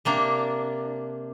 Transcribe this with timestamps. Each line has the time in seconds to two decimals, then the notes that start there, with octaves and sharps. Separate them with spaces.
0.05 C3 A#3 D4